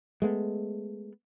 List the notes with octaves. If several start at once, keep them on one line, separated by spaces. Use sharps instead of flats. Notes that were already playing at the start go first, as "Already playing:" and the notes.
G#3 A3 B3